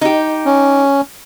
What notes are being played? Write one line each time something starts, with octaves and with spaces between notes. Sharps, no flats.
D#4 G4
C#4